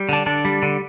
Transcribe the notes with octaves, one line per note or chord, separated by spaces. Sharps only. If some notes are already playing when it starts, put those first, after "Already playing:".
Already playing: G3
D3 D4
D3 D4
G3
D3